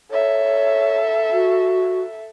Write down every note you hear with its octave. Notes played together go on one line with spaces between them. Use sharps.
A4 C#5 E5
F#4